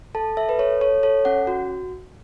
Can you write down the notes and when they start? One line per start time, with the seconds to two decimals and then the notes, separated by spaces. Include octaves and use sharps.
0.15 A4 A5
0.37 A4 E5
0.49 B4
0.59 A4 C#5
0.81 A4 C#5
1.03 A4 C#5
1.25 C#4 F#5
1.47 F#4